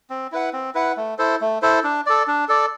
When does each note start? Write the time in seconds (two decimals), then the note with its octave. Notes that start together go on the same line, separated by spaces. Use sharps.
0.10 C4
0.32 E4 B4 F#5
0.53 C4
0.75 E4 B4 F#5
0.97 A3
1.18 E4 A4 C5
1.41 A3
1.62 E4 A4 C5
1.83 D4
2.06 A4 D5
2.27 D4
2.48 A4 D5